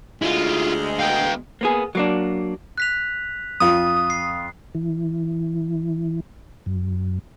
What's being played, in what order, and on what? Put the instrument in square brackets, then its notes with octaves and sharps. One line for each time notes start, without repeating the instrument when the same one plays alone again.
[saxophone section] D2 G#3 [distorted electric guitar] E4 F4
[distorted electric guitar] B3 F5 [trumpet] G5
[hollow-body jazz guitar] A#3 B3 G#4
F#3 A#3 D4
[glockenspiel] F#6 B6 F7
[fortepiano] F2 F4 [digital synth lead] D#6
[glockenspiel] C7
[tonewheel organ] E3
F#2